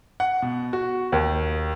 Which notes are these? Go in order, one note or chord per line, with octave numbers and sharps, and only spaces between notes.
F#5
B2
F#4
D#2